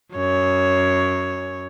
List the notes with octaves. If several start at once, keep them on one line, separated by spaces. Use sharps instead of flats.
F#2 C#5